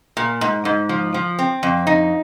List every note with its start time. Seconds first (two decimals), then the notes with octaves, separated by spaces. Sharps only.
0.17 A#2
0.41 G#2
0.65 G#2
0.89 F3
1.14 F3
1.39 C4
1.63 F2
1.87 D#4